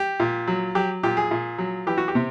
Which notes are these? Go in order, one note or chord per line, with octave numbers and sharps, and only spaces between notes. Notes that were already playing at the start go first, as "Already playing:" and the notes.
Already playing: G4
A#2
F#3
F#3 G4
A#2 G4
G#4
A#2
F#3
E3 G4
F#4
G4
C3